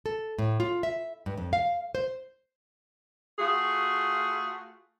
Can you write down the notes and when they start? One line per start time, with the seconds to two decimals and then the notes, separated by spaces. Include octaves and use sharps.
0.06 A4
0.39 A2
0.60 F4
0.83 E5
1.26 G2
1.37 F2
1.53 F5
1.95 C5
3.39 A3 F4 F#4 G#4